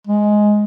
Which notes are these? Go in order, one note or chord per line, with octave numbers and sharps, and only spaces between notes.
G#3